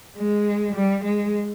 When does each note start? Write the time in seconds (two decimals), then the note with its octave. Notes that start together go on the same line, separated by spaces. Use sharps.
0.18 G#3
0.75 G3
1.04 G#3